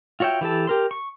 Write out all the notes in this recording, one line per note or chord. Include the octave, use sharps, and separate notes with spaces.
F4 F#4 C#5 E5 G5
E3 G4 A4 A5
G4 A#4 C6
C#6